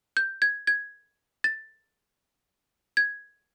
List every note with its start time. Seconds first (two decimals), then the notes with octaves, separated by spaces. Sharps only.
0.17 G6
0.42 G#6
0.67 G#6
1.44 A6
2.97 G#6